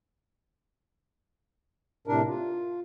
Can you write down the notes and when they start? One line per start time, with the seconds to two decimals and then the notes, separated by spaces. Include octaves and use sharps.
2.07 A2 C3 D4 A#4
2.28 F4